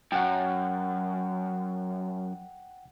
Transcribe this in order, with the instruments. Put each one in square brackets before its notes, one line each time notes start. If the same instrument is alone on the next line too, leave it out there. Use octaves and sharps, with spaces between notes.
[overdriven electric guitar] F#2 [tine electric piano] F#5 G5